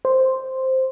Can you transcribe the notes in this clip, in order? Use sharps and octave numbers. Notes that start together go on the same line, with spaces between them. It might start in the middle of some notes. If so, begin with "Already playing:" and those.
C5